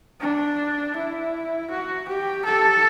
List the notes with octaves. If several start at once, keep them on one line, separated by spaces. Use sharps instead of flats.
D4
E4
F#4
G4
A4